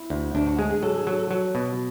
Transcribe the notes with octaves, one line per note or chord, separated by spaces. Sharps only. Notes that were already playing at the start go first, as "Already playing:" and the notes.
Already playing: E4
D2
D2 D4
F#4
G#3 G#4
G#4
F#3 A4
G#4
F#3 A4
A4
F#3
B2